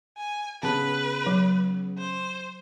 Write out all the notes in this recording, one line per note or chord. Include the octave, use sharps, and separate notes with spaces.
G#5
C#3 B3 G#4 B4 A5
F#3
C5